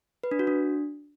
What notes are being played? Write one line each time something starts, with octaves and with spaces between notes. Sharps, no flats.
B4
D4
F#4
D4